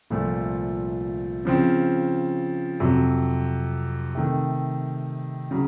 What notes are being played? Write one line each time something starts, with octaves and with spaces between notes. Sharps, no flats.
C2 A#2 F3 A3
C#3 F3 C4
F2 C3 F#3
C3 D#3 A3
C#3 F#3